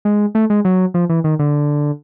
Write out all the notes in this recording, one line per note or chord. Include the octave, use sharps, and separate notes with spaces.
G#3
A3
G#3
F#3
F3
E3
D#3
D3